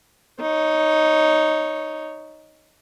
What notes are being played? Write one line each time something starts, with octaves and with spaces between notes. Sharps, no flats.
D#4 C#5